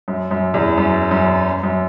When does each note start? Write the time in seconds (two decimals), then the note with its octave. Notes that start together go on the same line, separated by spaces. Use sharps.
0.08 F#2
0.31 F#2
0.54 E2
0.78 F#2
1.11 F#2
1.63 F#2